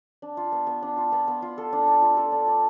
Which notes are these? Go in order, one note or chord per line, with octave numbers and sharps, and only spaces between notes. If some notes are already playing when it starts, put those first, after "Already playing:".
D4
F4
B3
B3
D4
F4
B3
B3
F4
A4
D4
D5
F4
A4
D4
D5